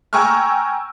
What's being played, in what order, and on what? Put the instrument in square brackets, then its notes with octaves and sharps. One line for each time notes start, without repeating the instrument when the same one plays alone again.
[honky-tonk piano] G5 G#5 A#5 C#6 E6 F6